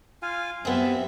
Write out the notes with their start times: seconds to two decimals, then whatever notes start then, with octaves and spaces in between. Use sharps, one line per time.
0.22 F4 F5 G#5
0.65 F#2 G3 B3 C4 G#4 E5